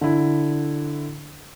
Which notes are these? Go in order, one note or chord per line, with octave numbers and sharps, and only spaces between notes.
D3 E4